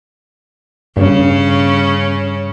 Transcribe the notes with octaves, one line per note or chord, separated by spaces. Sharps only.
G2 C#3 C#4